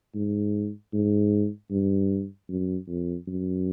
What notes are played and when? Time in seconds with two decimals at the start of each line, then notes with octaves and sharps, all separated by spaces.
0.15 G#2
0.93 G#2
1.71 G2
2.49 F#2
2.88 F2
3.28 F#2